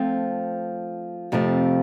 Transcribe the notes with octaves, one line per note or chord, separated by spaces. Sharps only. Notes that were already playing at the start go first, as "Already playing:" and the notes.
Already playing: F3 A3 C4
F2 C3 F3 A3